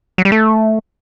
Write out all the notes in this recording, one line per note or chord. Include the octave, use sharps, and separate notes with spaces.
F#3
G3
A3